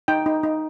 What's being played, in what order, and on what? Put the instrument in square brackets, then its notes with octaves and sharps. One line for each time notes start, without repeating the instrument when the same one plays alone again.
[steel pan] D#4 G5
D#4
D#4